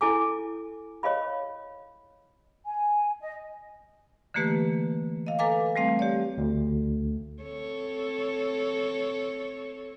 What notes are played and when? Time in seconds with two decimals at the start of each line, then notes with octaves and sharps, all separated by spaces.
0.01 E4 A4 G#5 D6
1.03 C#5 D#5 F5 B5
2.66 G#5
3.21 D#5
4.34 D3 E3 A3 A#3 G4 B4
5.27 D#5 F5
5.39 A4 B4 F5 G#5 A#5 D6
5.76 G3 A3 C4 F5
5.99 G4 C#5 D5
6.38 D2
7.43 C4 A4 C#5